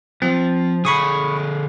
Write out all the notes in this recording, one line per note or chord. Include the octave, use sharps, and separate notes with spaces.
F3 C4
D3 G#4 B5 C#6 D#6